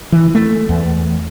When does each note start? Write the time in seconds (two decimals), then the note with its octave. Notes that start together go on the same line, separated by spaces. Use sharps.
0.12 E3
0.35 A3
0.69 E2